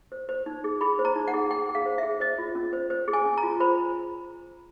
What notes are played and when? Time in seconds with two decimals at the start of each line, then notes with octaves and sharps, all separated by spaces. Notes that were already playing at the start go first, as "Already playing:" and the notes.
0.12 C5
0.29 C5
0.46 D#4
0.64 G#4
0.81 G#4 B5
0.99 C5
1.05 A#5
1.16 D#4
1.28 F#5
1.34 G#4
1.51 G#4 G5
1.69 G#4
1.75 F5
1.86 C5
1.98 G#4 E5
2.20 C5 D#5
2.38 F4
2.55 C#4
2.73 C5
2.90 C5
3.08 G#4
3.13 G#5
3.25 C#4
3.38 A#5
3.43 F4
3.60 C5 B5